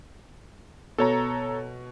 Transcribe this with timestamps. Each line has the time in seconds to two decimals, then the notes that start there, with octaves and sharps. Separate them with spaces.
0.98 B2 A4 C#5 A#5